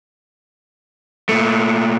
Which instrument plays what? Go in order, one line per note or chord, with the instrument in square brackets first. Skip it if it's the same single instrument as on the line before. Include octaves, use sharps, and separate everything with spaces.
[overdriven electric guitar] A#2 A3